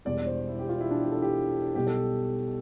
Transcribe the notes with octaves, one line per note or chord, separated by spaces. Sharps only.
E1 E2 B2 G3 D5
D5
C5
E4
G4
F4
E4
D4
G4
A4
G4
B1 B2 G3 G4
A4